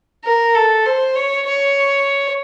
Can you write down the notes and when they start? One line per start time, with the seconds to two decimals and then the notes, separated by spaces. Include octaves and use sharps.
0.24 A#4
0.55 A4
0.86 C5
1.15 C#5
1.46 C#5